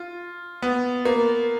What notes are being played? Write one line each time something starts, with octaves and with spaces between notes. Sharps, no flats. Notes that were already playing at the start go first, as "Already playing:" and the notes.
Already playing: F4
B3
A#3